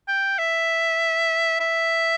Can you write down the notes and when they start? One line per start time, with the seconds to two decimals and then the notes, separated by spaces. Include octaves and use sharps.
0.08 G5
0.39 E5
1.60 E5